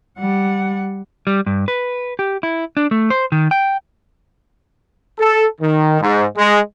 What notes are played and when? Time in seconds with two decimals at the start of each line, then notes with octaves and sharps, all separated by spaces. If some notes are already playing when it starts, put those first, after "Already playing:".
0.18 G3 F#5
1.27 G3
1.46 G2
1.68 B4
2.19 G4
2.43 E4
2.77 D4
2.91 A3
3.10 C5
3.32 D#3
3.51 G5
5.19 A4
5.60 D#3
6.01 G#2
6.37 G#3